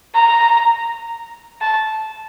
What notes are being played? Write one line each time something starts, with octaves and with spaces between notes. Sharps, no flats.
A#5
A5